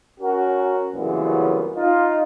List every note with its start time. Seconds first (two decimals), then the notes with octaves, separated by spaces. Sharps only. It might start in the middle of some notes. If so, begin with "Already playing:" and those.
0.20 C#4 F#4 A#4
0.93 C2 F#2 A#2 C#3 E3 B3
1.76 D#4 F4